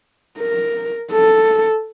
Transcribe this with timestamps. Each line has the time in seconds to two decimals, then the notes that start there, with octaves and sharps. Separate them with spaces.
0.39 A#4
1.12 A4